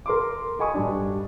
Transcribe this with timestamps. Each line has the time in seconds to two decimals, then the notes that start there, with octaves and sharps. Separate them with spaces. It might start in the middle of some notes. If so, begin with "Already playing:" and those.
0.06 A#4 C6 D6
0.59 A4 D#5 G#5 B5 C#6 D#6
0.74 G2 G3 D4